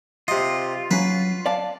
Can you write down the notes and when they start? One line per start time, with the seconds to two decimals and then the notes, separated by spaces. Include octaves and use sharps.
0.28 C3 F4 D#5
0.91 F#3 C#4 B4
1.46 D5 F5 A5